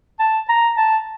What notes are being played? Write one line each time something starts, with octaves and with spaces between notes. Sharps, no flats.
A5
A#5
A5